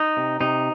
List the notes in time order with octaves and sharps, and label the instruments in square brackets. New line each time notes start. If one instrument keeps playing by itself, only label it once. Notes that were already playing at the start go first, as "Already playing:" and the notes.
Already playing: [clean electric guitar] D#4
C3
C3 D#4